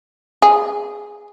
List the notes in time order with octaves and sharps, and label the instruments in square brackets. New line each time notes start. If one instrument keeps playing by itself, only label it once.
[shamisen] G#4